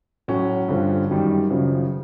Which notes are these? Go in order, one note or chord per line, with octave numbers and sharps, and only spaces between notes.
A2 F#3 C#4
G2 D3 F3
F#2 D#3 G3
F#2 C#3 F3